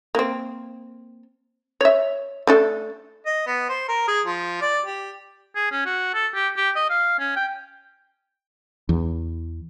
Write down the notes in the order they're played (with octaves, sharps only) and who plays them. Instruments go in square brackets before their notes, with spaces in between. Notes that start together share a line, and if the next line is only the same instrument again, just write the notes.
[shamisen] A#3 C4
C#5 E5
A3 D4 A4
[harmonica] D#5
B3
C5
A#4
G#4
F3
D5
G4
[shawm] G#4
C#4
F#4
A4
G4
G4
D#5
F5
C#4
G5
[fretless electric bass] E2